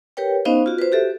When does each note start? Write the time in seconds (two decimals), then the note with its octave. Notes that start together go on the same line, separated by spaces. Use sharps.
0.17 G4 A#4 B4 C#5 G5
0.45 B3 C#4 D#4 C5 D#5 F5
0.66 F4 F#4
0.78 B4 C5
0.92 F#4 G4 A4 E5